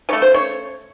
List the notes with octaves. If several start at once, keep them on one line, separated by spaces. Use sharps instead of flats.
C#3 A3 C#5
C5
C#5